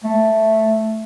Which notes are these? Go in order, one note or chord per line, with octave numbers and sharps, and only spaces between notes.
A3